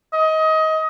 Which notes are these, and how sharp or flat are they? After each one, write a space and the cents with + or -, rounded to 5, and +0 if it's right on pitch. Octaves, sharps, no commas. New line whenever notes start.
D#5 +25